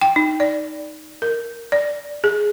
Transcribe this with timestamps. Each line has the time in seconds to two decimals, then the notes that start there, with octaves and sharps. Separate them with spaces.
0.01 G5
0.16 D#4
0.40 D5
1.22 A#4
1.72 D5
2.24 G#4